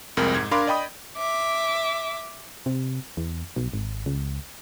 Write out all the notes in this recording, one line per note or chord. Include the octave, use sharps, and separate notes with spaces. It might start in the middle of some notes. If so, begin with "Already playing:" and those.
C2 F2 G#3 A#4
G#2 G#6
D4 A#4 F5 B5 C6 D6
D5 D#5 G5 B5 D#6
E5 D6
C3
E2
B1
G#1
C#2